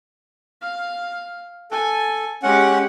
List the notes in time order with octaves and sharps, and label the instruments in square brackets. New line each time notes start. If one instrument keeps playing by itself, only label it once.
[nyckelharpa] F5
[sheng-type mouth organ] A4 [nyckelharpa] G#5
[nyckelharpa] G#3 G4 [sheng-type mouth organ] C#4 F#5